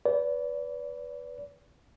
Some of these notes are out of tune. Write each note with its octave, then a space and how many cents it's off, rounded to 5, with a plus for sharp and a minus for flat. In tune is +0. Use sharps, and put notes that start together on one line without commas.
B4 +0 D5 -30